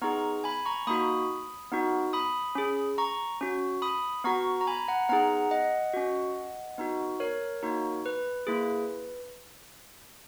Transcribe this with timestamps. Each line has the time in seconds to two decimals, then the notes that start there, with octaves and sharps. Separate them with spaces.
0.02 B3 D#4 G#4 A#5 C#6
0.44 G#5 B5
0.66 A#5 C#6
0.87 A#3 D#4 F#4 B5 D#6
1.72 B3 D#4 F#4
2.13 B5 D#6
2.55 C#4 G#4
2.98 A#5 C#6
3.41 C#4 F#4
3.82 B5 D#6
4.24 B3 F#4 A#5 C#6
4.61 A#5
4.67 G#5 B5
4.88 F#5 A#5
5.09 B3 D#4 G#4 F#5 A#5
5.51 D#5 F#5
5.94 C#4 F#4
6.78 B3 D#4 F#4
7.20 A#4 C#5
7.63 A#3 D#4 F#4
8.06 B4
8.47 A#3 E4 G#4